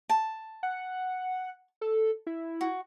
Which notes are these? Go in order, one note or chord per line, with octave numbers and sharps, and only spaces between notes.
A5
F#5
A4
E4
F#4